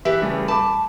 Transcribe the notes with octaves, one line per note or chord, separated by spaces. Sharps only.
E3 G4 B4 E5
C#3 G3 A3
A5 B5 D6